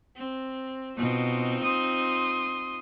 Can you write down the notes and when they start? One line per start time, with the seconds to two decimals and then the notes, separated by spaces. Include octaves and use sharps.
0.16 C4
0.97 B2 C4 D#4 F4
1.62 C6 D#6